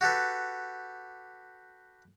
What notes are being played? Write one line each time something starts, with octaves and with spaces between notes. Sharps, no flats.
F#4 G4 A4 B4